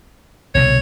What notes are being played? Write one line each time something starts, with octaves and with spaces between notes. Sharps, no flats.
C2 B2 D3 C#5